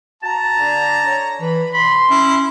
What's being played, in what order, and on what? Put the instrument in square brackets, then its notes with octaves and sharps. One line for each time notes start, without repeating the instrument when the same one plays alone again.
[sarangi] F#4 [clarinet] A5 [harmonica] A#5
[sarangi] D3
C#5
[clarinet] E3 [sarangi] B5
[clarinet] B5 [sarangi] C6
[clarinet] C#4 [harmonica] E4